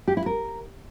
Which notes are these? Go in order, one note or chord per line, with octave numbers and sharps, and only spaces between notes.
G4
E4
A#4